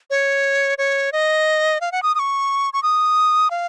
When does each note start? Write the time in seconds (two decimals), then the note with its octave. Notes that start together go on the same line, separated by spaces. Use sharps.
0.10 C#5
0.78 C#5
1.12 D#5
1.81 F5
1.92 F#5
2.03 D#6
2.15 D#6
2.19 C#6
2.73 C#6
2.83 D#6
3.51 F5